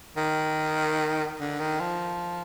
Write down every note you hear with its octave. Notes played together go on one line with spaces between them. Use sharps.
D#3
D3
D#3
F3